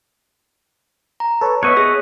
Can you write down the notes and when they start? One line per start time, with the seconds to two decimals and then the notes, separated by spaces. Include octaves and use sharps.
1.20 A#5
1.41 A4 B4 C#5
1.63 B3 C#5 D#5 E5 C#6 F#6
1.76 G#4 A#6